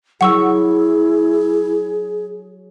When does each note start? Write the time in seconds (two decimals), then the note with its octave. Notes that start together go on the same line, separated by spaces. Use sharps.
0.21 F#3 E4 G#4 F#5 C#6 E6